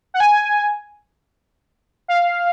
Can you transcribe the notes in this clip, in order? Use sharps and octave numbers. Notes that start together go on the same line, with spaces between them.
F#5
G#5
F5